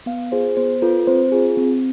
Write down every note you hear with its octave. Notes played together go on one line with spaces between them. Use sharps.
B3 F5
F4 G#4 C5
B3 C5
F4 A4 B4
C4 C5
F4 G#4
C4